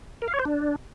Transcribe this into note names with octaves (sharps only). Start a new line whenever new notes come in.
A#4
F5
C#5
C5
D4